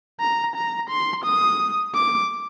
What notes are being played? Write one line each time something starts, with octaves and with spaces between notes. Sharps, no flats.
A#5
A#5
C6
D#6
D6